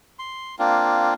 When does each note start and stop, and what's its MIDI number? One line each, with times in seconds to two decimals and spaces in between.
0.19 0.55 84
0.59 1.14 58
0.59 1.14 60
0.59 1.14 62
0.59 1.14 65